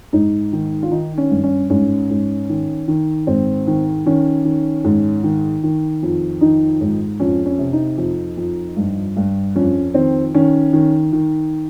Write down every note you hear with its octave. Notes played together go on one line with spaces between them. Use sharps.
G#2 D#4
D#3
F4
D#3 D#4
C#4
G2
C#4
G#2 C#4
G#2
D#3
D#3
G#2 C4
D#3
D#3 C#4
D#3
G#2
D#3
D#3
F2
D#3 D#4
G#2
F2 C#4
C#4
C3
D#4
F2
F2
G2
G2
F2 C#4
D#3 C4
D#3 C#4
D#3
D#3